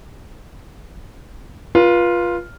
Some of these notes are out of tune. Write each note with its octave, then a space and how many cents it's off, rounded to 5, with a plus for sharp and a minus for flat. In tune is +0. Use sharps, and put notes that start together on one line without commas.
F4 +0 B4 -35